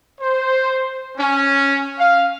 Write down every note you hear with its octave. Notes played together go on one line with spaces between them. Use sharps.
C5
C#4
F5